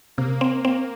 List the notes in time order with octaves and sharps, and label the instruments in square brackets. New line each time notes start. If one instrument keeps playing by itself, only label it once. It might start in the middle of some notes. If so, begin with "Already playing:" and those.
[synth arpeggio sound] C3 [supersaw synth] A#3
[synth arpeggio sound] C4
C4